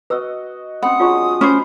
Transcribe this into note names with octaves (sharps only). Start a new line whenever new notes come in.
F#4 B4 D#5 E6
C4 C#4 F#5 B5 D#6
F#3 G#3 D4 F4 C#5 C#6
C#4 C5 B5